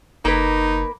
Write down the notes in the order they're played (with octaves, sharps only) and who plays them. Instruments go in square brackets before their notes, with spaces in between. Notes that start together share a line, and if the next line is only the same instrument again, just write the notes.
[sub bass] F#1 [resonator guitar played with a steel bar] A#3 B4 [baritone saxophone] D#4